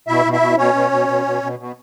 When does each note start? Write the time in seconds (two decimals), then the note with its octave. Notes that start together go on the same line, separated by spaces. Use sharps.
0.08 B2 E4 E5
0.25 B2
0.33 E4 E5
0.41 B2
0.58 B2 C#4 C#5
0.74 B2
0.92 B2
1.08 B2
1.26 B2
1.42 B2
1.59 B2